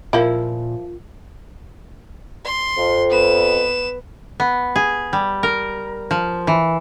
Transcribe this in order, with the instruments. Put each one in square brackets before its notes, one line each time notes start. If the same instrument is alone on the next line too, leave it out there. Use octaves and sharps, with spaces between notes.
[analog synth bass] A#2 [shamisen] F3 E4 [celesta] F4 [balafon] A#4 F5
[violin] C6
[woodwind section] F2
[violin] B3 E7
[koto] B3
G#4
G3
A#4
F3
E3